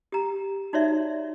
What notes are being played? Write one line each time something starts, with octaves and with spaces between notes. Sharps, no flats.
G4 A#5
D#4 F#4 C#5 D5 E5